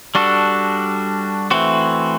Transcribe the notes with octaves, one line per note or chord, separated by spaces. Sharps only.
G3 D4 F#4 A4
E3 A3 C4 F#4